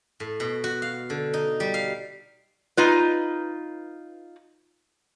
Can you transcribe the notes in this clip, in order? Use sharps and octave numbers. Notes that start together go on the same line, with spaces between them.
A2
B2
F#4
F5
D3
D#4
G3
F5
D#4 F4 B4